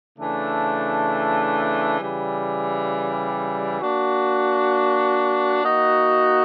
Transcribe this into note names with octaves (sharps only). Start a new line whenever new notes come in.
C#3 E3 A3 D4
C#3 E3 G3
A#3 D4 F#4
A#3 D#4 F#4